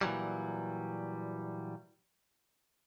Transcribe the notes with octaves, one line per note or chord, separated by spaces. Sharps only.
A#2 E3 F#3 G3